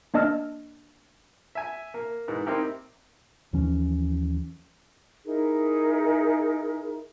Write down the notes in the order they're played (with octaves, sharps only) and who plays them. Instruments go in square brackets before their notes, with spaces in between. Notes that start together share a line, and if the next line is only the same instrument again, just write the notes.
[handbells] A#3 D4 D#5 A5 E6 F6
[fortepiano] E5 G#5
A#3
G#2 E3
A#3 C4 D#4 E4 G4 A#4
[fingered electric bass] D#2 E3 F3 C#4
[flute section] D#4 E4 G#4 A#4